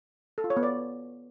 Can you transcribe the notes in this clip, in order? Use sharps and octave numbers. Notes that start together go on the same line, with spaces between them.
A4
F4
C#5
B3
D5